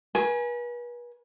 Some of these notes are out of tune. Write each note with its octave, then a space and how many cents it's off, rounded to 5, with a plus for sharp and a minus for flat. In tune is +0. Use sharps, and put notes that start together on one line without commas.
B4 -40 G#5 +5